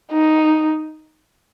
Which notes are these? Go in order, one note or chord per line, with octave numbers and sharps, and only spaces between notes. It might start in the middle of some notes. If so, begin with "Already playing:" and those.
D#4